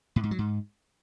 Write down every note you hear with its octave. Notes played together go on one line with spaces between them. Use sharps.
A2
G#2
F#3
G#2